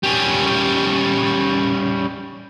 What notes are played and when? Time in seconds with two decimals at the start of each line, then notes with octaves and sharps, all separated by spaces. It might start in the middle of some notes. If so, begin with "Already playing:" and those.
0.03 G3 C#4